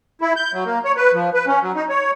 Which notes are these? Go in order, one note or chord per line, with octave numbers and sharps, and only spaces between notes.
E4
G6
F#3
A#3
C#5
B4
F3
B4
C#4
F#3
D#4
C#5